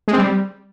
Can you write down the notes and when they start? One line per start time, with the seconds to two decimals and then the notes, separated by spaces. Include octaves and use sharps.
0.08 G#3
0.13 C4
0.18 G3